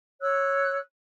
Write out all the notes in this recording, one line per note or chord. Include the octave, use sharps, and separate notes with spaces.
C#5 E6 F#6